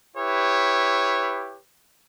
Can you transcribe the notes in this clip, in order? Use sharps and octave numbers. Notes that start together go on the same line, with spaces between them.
E4 G4 B4 C#5